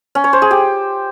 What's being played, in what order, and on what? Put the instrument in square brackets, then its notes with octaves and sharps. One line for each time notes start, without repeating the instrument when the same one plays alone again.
[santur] C#4
C#5
C5
G#4
G4